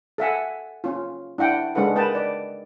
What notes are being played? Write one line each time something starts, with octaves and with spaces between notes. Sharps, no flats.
A4 E5 F#5 G#5
C#4 F4
D4 E4 F#5 G5
G#3 D4 A4 B4 F#5
A#4 B4 D#5 G5 A5
D5